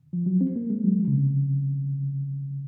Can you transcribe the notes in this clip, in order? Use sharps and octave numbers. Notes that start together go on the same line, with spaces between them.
F3
F#3
C4
A#3
G#3
F#3
F3
C#3
C3